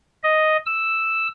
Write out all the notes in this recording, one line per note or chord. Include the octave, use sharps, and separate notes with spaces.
D#5
E6